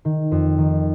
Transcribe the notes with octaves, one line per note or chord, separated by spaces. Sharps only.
D#3
F2
D#3